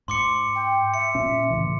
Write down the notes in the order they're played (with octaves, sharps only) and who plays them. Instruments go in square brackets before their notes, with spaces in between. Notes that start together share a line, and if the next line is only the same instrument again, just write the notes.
[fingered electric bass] G#2 [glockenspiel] C6 D6 C#7
[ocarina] G5
[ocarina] E5 [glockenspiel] C#7
[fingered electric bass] A#2 C#4
A2 C#3 E3